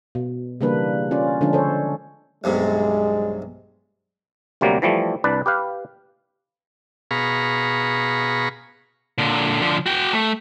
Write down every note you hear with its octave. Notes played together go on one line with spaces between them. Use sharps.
B2
C#3 E3 G3 A#3 D4 B4
C#4 F4 D5
D3 F3 G#3 C#4 D4
A4 C5 C#5
B1 G2 C3 G#3
D2 C3 F#3 G3 A#3
E3 F3 G3 A3
C2 D4 B4 D5
G4 B4 F5
B2 G#4 F5 A#5 B5 C#6
A#2 D3
D3 F3
F#4 G5
A3